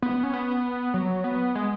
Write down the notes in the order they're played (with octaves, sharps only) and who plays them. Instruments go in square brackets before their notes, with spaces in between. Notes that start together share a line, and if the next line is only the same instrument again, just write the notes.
[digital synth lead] B3
C#4
B3
F#3
B3
G#3